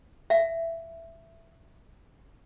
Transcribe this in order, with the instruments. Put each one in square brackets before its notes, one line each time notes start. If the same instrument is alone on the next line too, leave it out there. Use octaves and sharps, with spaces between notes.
[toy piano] E5 F5